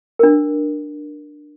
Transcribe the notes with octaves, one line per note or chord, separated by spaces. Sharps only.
D4 A#4